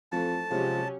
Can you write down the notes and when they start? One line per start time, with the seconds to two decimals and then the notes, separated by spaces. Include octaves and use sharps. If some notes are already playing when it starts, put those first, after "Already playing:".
0.12 F2 E3 F3 A3 A5
0.51 C3 F3 F#3 G#3 C#4 G4